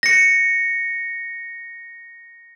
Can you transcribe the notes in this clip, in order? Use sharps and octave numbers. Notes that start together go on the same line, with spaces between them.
A#6 C#7